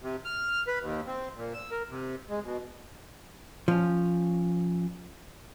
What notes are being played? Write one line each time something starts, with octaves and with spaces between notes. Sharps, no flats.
C3
F6
B4
D#2
C4
A#2
E6
A#4
C3
G#3
B2
F3 C#4